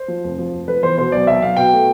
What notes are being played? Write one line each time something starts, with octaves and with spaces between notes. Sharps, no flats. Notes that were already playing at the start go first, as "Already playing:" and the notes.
Already playing: C5
F3
F1
F3
F1
F3 B4
E2 C5
B2 C5
B1 D5
B1 E5
B1 F5
B2 G5
A3